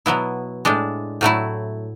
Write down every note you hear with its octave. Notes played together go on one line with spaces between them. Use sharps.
B2 F#3 B3 E4
A2 G#3 D4
A2 F#3 A3 E4